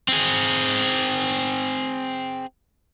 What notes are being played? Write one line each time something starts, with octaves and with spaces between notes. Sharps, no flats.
C4 G#4